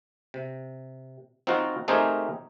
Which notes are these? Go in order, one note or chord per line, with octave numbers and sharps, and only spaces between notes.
C3
C4 D#4 F4 F#4
A3 C4 D#4 G4 G#4 A#4